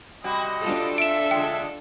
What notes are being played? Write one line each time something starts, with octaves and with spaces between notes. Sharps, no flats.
C3 G3 F#4 D#5
D4 F4 A4
E5 D7 E7
D3 G#3 G5